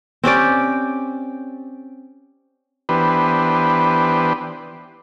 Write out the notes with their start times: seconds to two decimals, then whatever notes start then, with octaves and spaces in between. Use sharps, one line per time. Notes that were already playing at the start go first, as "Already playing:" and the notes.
0.24 C4 C#4 G4 D5
2.89 E3 B3 D4 G4 B4 C5